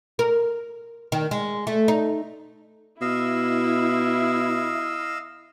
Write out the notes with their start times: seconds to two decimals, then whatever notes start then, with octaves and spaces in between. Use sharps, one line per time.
0.19 A#4
1.12 D#3
1.31 G#3
1.67 A3
1.88 D#4
3.01 B2 E4 D#5 F5 E6